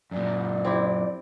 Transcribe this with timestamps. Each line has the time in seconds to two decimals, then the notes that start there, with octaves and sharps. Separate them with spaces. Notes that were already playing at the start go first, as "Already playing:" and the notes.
0.11 F#2 A#2 D5
0.65 C4 E4 G4